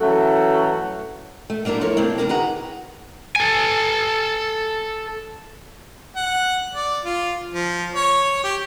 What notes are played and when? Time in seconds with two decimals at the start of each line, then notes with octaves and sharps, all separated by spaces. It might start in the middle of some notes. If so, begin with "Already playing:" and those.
0.01 E3 F#3 A3 C#4 F#4 A4
1.50 A3
1.65 F#3 A#3 D4 E4 A#4
1.81 F3 E4 A4 A#4 C#5
1.97 C#3 A3 A#3 C4 D4
2.18 D#2 E3 A#3 D4 A#4 A#5
2.29 D#3 F#4 G#4 B4 F#5 A#5
3.36 A4 G#5
6.16 F#5
6.74 D5
7.05 F4
7.54 F3
7.95 C#5
8.44 G4